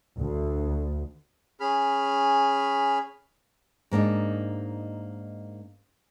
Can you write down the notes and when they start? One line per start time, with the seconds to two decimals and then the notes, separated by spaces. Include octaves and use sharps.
0.17 D2
1.60 C#4 G#4 B5 F6
3.91 G#2 A#3 D4 D#4